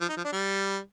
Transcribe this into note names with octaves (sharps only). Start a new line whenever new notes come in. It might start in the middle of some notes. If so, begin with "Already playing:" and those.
F3
D#4
F3
D4
G3